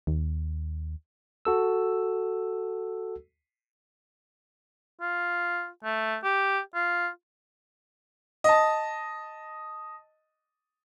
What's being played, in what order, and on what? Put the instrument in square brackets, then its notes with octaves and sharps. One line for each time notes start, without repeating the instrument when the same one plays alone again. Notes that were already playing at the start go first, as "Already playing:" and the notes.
[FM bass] D#2
[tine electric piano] F#4 A4 E6
[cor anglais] F4
A3
G4
F4
[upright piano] D#5 A5